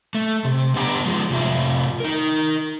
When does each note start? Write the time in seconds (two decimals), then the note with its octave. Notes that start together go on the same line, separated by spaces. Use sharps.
0.15 A3
0.45 C3
0.76 D3 B3 G4 G5 A5 A#5
1.06 F3 G#3
1.31 A2 C3 F4 E5
2.00 D#4 A#4